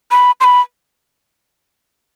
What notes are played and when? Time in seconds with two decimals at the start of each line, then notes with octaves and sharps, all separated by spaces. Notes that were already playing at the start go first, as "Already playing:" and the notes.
0.11 B5
0.40 C6
0.44 B5